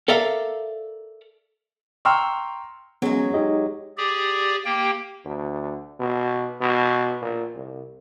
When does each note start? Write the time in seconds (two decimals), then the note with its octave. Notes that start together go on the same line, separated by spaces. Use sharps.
0.08 A4 A#4 D5 E5 F5 A#5
2.05 G5 A#5 C6 C#6 E6 F6
3.02 F#3 G#3 B3 C#4 G#4
3.34 D#4 G4 D#5
3.97 G4 G#4 D5
4.65 A#3 G4 G5
5.26 D2
5.99 B2
6.61 B2
7.21 A#2
7.55 C2